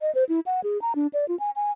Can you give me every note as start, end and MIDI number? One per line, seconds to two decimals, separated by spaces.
0.01 0.13 75
0.15 0.24 72
0.29 0.40 64
0.46 0.60 78
0.64 0.81 68
0.82 0.95 82
0.95 1.07 62
1.13 1.28 74
1.28 1.38 65
1.40 1.51 80
1.56 1.71 80